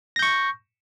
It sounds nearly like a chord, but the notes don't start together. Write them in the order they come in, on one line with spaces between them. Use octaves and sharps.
A#6 G6 C#6